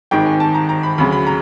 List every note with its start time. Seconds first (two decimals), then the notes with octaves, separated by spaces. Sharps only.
0.11 G#1 G#2 D#3 G5
0.26 G#5
0.40 A5
0.55 A#5
0.69 A#5
0.83 B5
0.98 D2 C#3 F#3 B5
1.12 B5
1.27 A#5